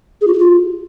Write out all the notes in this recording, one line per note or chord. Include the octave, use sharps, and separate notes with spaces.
G#4
F4
F#4
F4